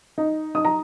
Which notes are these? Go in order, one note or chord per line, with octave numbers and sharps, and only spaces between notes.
D#4
D#4 D#6
A#5